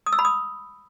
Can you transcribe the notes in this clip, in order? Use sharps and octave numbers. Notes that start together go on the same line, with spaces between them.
D#6
E6
B5
D#6